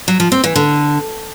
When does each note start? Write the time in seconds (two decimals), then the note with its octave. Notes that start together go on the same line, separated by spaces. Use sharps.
0.08 F#3
0.20 F3
0.32 C4
0.44 E3
0.56 D3